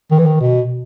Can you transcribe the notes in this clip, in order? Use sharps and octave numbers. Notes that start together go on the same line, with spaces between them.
D#3
E3
D#3
B2